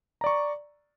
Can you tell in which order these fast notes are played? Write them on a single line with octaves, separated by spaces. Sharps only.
A#5 D5 C#6